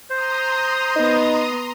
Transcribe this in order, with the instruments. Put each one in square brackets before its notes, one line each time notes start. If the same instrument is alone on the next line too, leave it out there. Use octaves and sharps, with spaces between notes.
[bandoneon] C5 [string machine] A#5 C6 D#6
[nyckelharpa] B3 [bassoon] D#4